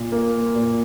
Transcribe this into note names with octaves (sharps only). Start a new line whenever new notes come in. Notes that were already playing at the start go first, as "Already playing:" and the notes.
Already playing: A#2
A#3
A#2